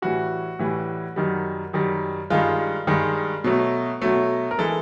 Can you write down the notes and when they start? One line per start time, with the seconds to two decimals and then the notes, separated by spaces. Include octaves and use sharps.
0.02 A2 E3 G3 F#4
0.59 A2 E3 G3
1.16 F#2 D#3 G3
1.73 F#2 D#3 G3
2.30 G2 D#3 G#3 F4
2.87 G2 D#3 G#3
3.44 B2 F#3 A3
4.02 B2 F#3 A3
4.51 A#4
4.58 E3 G#3 A4